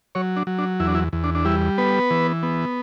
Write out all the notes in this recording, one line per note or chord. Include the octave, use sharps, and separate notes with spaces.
F#3 C#5
D4
F#3
D4
E2 E4
D4
E4
E2
D4
D4
G3 E4
B3 B4
E3
B3